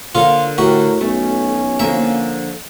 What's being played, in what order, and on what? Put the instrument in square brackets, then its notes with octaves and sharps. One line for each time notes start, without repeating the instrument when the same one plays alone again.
[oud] D3 A#3 C#5 [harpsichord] F4
[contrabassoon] A2 [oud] D3 G4 [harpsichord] F#4 [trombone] A#4
[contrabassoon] B1 [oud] A3 [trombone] C#4
[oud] D3 F3 A#3 [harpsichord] E5